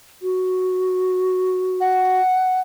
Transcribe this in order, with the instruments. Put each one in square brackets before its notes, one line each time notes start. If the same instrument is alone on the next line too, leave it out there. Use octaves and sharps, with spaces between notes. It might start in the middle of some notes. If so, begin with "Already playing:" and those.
[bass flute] F#4
[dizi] F#5